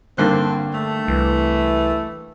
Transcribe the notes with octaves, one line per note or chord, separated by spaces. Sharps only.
G2 D3 A#3 C4 F#6
A3
C2 E3